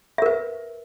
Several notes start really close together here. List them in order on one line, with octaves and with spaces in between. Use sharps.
E5 A#4 B4